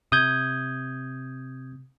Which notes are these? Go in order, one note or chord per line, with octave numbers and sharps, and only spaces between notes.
C3 D#6 G6 G#6